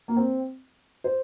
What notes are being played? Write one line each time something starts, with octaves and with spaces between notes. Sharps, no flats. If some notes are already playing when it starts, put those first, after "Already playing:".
A#3
C4
C5